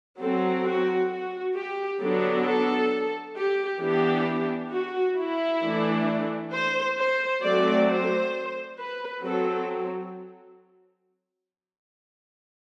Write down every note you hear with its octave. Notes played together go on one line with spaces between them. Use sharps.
F#3 C4 A4
F#4
F#4
G4
D3 F#3 B3 D4 A4
A4
G4
E3 B3 D4 G4
F#4
E4
E3 A3 D4
C5
C5
F#3 A3 C4 D5
C5
B4
F#3 C4 A4